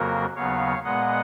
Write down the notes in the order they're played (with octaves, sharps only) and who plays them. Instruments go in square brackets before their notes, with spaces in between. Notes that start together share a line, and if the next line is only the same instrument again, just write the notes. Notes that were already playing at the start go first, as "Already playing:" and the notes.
Already playing: [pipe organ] F2 C#3 F#3 A#3 F#4 A#4
D#2 C#3 F#3 B3 C#5 F5
A#2 G#3 B3 D#5 F#5